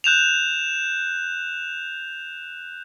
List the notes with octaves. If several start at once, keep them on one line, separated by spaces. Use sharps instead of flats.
F#6 G6 E7 F7